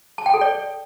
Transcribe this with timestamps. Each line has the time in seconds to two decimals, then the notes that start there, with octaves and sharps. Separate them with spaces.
0.18 A5
0.26 G5
0.34 A4
0.41 D5